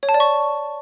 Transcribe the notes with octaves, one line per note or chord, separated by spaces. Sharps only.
C#5
A5
D5
C#6